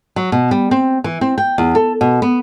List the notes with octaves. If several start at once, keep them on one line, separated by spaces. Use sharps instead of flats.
F#3
B2
G3
C4
E3
C4
G5
E2
A4
B2
B3